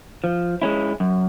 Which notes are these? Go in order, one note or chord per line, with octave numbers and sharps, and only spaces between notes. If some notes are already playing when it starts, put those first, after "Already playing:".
F3
G#3 C#4 E4
F#2